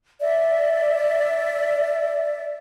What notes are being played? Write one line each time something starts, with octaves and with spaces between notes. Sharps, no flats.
D5 E5